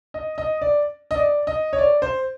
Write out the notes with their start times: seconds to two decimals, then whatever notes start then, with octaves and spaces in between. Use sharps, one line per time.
0.14 D#5
0.38 D#5
0.62 D5
1.11 D#5
1.16 D5
1.47 D#5
1.73 C#5
1.78 D5
2.02 C5